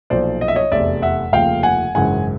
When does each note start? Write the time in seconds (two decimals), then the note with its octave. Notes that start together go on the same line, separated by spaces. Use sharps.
0.10 B1 A#2 F3 C5 D5
0.41 D#5
0.48 E5
0.56 C#5 D#5
0.72 F1 E2 C3 D5 E5
1.02 E5 F#5
1.32 F1 D#2 C#3 F3 F5 G5
1.63 F#5 G#5
1.95 G#1 F#2 C#3 E3 F#5 G#5